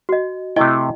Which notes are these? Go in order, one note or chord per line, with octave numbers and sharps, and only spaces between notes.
F#4 D#5
C3 A3 E4 D#5 G5